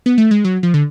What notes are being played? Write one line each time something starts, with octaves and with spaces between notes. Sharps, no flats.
B3
A3
G#3
F#3
F3
D3